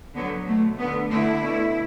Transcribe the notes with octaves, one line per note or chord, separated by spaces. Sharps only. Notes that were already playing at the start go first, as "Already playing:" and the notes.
D3 F#3 B3
B2 A3
D3 B3
D3 A3 E4
B2 A3